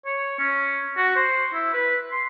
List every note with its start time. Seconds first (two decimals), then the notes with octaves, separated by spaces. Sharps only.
0.06 C#5
0.39 C#4
0.97 F#4
1.16 C5
1.54 E4
1.73 B4
2.12 C6